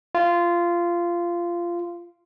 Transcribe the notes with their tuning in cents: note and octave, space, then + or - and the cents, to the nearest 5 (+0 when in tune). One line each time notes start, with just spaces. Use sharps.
F4 -15